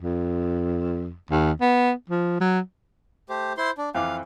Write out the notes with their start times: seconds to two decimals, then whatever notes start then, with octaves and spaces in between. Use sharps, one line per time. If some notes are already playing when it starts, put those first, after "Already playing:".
0.02 F2
1.31 D#2
1.61 B3
2.09 F3
2.40 F#3
3.29 A3 G4 C5
3.57 E4 C5 C6
3.78 D4
3.95 F2 E3 F5 D6